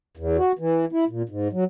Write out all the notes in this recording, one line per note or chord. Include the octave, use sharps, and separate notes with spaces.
E2
F#4
E3
E4
A#2
G#2
F#3